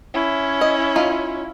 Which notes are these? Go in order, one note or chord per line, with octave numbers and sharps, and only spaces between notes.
C#4 E4
D#5
D#4 F4